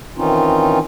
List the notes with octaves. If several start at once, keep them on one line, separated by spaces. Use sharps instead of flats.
D#3 E3 C4 C#4 D#4 F4